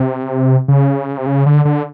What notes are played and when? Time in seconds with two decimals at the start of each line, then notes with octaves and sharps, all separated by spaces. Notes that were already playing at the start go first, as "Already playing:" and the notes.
Already playing: C3
0.68 C#3
1.18 C3
1.26 C#3
1.46 D3
1.65 D3